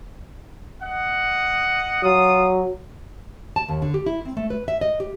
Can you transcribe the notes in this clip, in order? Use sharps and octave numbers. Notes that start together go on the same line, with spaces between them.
D#5 F#5
F#3 F4 D#6
A5
D#2
D3
G4
E4
C4
A3
B4
E5
D#5
G4